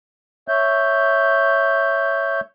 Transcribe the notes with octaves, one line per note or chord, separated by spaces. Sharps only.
C#5 E5 G6